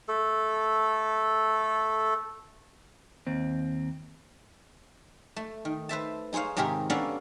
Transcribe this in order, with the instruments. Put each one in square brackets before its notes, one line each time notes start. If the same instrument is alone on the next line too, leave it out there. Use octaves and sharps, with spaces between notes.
[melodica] A3 A4
[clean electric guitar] D#2 C4
[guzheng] A3
D#3
B4 C5 E5 A5
D#4 G#4 C5 C#5 F5
G#2 C3 D#3 G4 G#4 A#4
A#3 B3 C#4 D4 A4 F5